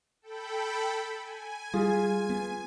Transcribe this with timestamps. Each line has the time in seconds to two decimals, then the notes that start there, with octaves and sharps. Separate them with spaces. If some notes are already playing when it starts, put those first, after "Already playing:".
0.22 A4 G5 B5
1.20 G#5
1.74 G3 F4 G#4
2.29 B3